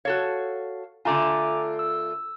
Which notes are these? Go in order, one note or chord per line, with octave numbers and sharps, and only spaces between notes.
F#4 A4 C#5 F5
D3 A3 F4 G#5 A#5 D6
E6